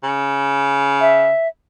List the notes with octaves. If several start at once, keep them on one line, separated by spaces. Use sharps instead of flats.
C#3
E5